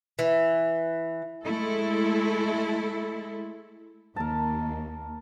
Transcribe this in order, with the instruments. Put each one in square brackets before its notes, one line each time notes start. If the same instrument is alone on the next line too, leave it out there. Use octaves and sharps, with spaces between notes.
[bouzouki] E3
[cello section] G#3 A3 E4 A4
[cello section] D#2 [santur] A#4 A5